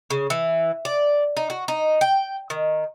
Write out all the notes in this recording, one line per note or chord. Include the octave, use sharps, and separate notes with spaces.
C#3
E3
D5
D#4
F#4
D#4
G5
D#3